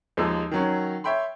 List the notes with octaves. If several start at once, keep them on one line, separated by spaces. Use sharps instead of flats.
D#2 F3 G#3 D#4 E6
D#3 F#3 C#4
C#5 E5 G5 B5 C6